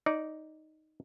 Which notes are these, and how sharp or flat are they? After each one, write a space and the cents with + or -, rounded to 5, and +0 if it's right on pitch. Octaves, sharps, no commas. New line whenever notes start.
D#4 +0 D5 -10